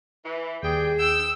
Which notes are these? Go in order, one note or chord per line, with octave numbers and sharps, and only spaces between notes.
E3
D#2 G3 G#4 G5
G5 E6